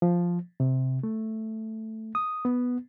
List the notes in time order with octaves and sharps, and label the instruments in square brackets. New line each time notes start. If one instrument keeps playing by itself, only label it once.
[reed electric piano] F3
C3
A3
D#6
B3